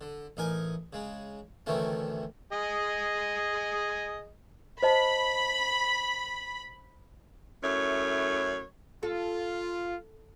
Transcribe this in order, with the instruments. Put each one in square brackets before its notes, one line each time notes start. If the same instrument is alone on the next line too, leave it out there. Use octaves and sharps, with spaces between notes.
[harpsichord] D3
A1 D#4 A#4 G#5
C#3 G#3
D2 C3 D#3 E3 A3 C#4
[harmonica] G#4 D#5
[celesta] C5 D#5 A5 [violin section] B5
[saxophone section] F#2 A3 E4 C#5
[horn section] F4 [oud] A4